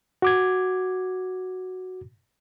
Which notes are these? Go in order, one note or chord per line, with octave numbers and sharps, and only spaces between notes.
F#4 D6 G#6